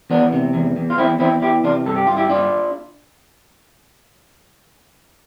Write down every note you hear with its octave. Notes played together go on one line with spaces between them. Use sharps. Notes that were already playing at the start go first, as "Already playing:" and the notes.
E2 B3 D4
C3
E2
E2
F4
E2 C4 E4
E2 C4 E4
E3 E4 G4
C3 D4 F4
G2 A4
G4
G2 F4
E4 G4
G2 D4 F4